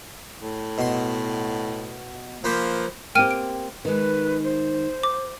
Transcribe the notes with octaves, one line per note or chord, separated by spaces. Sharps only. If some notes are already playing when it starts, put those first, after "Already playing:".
A2
B2 C6
F3 A#3 B4 C5
A#3 C4 G4 G5 F6 D#7
D7
D#3 G#3 B4
C5
D6